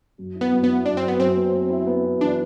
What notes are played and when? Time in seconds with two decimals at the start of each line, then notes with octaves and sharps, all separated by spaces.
0.18 F#2
0.35 E4
0.41 B3
0.52 F#2
0.64 B3
0.69 E4
0.86 F#2 D4
0.97 C4
1.02 F#2
1.08 B3
1.19 F#2 C4
1.36 B3
1.54 B3
1.70 E4
1.86 B3
2.04 E4
2.21 E3 D4